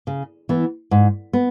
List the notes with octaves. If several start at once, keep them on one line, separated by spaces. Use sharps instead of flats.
C#3
E3 B3
G#2
B3